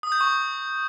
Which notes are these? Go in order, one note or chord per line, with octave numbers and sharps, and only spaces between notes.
D#6
G6
C#6